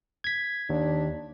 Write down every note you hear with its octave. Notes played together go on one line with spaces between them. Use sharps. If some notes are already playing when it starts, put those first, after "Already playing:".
G#6 B6
D#2 D4